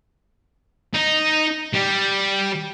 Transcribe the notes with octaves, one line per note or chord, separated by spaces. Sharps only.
D#4
G3